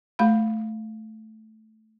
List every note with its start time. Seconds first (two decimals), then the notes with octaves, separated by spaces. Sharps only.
0.19 A3 F5 B5